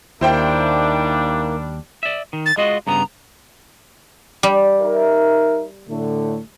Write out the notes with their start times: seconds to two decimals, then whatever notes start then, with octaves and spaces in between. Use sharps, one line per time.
0.21 D#2 D#3 G3 A#3 D4 E4 C5 G5
2.03 D5 E5
2.33 D#3
2.46 A6
2.57 G#3 F4 F#4 D#5
2.87 G2 C#3 B3 A#5
4.43 G3
4.81 D#4 A#4 E5
5.89 A2 D3 A3